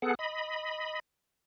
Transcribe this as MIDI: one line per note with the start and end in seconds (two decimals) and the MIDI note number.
0.02 0.15 59
0.02 0.15 68
0.02 0.15 69
0.02 0.15 78
0.19 1.00 75
0.19 1.00 83